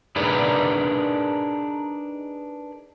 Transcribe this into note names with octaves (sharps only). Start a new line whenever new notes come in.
D4 D#4 G#4 A#4 B4 D5